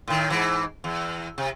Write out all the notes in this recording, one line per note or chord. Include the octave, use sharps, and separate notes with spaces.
A2 D#3
G#2 E3
E2
C3